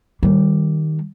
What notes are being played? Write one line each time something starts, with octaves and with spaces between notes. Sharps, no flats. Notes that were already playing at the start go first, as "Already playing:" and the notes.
D#3 G3